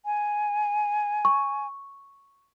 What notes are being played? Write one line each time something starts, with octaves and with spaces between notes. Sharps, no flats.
G#5
C#6